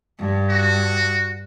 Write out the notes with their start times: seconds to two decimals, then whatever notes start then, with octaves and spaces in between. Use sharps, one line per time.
0.18 G2
0.50 F#4